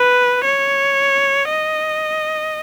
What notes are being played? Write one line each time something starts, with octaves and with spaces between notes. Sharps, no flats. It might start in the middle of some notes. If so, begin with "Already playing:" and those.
Already playing: B4
C#5
D#5